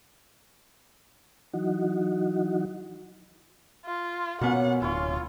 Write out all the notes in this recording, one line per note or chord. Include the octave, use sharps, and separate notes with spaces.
E3 F#3 D#4 F#4
F4
B2 A#3 B3 C#4 F4 F#5
D1 E4 F4 C#5 D5